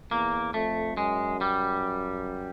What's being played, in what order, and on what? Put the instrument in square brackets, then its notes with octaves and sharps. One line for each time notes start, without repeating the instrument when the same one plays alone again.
[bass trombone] E2 [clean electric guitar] A#3
[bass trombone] F2 [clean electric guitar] A3
[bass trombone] F#2 [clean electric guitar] G#3
[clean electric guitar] G3